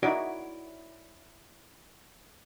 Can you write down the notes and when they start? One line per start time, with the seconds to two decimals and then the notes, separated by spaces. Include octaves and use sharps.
0.03 D#4 E4 F#4 C#5 D5